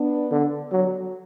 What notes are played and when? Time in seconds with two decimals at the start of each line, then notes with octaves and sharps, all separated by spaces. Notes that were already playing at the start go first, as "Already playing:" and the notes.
Already playing: B3 D4
0.32 D3
0.72 F#3